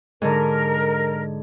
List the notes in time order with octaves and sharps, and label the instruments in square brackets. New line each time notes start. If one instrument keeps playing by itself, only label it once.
[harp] G#2 D3 [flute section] A#4